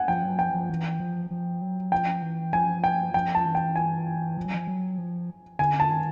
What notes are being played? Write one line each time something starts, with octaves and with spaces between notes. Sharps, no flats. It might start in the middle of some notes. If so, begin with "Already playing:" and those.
Already playing: F#5 G#5
F3 G5
F#3
F3 G5
F3
E3
F3
F3
F#3
F3 G5
E3
F3 G#5
G5
F3 G5
A5
E3
G5
G#5
F3
F#3
F3
F#3
F3
D3 G#5
A5
D#3